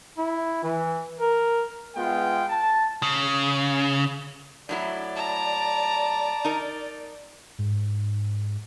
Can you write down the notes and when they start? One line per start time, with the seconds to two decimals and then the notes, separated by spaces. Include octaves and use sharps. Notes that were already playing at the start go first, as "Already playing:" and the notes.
0.18 E4
0.63 E3
1.19 A#4
1.96 G#3 B3 F4 G5
2.49 A5
3.03 C#3
4.69 A2 F#3 E4 D5
5.16 A5 A#5
6.45 D#4 A#4
7.59 G#2